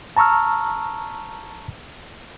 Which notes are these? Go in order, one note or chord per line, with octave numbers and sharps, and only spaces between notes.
A5 A#5 C#6 E6 F6